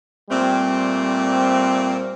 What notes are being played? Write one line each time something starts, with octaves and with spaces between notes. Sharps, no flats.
A#2 G3 A3 C4